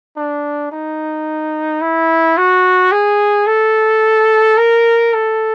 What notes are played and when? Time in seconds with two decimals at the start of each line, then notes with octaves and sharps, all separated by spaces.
0.17 D4
0.72 D#4
1.82 E4
2.37 F#4
2.92 G#4
3.47 A4
4.58 A#4
5.14 A4